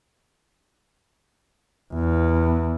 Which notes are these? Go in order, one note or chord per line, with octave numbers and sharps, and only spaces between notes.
E2